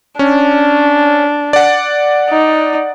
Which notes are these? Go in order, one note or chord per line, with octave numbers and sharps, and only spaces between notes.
C#4 D4
D5 F#5
D#4